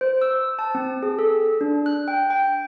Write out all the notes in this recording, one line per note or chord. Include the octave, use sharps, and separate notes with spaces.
C5
E6
A5
C4
G#4
A4
D4
F#6
G5
G5